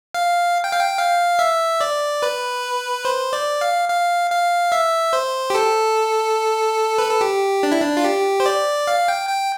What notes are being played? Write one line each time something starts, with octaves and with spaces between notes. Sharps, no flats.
F5
G5
F5
G5
F5
E5
D5
B4
C5
D5
F5
F5
F5
E5
C5
G4
A4
B4
A4
G4
D4
E4
D4
F4
G4
C5
D5
F5
G5
G5